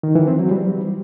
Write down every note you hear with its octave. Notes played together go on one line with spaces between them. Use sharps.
D#3
E3
C4
F#3
G3